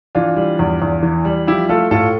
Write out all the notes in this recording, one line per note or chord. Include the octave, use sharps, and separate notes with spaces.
E3 D4 F4
G3
E2
E2
E3
G3
F3 E4 G4
A3 F4 A4
A2 F4 A4